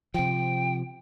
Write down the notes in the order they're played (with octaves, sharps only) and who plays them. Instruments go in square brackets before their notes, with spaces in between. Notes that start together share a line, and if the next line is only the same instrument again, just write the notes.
[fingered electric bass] C3 F3 [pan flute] G5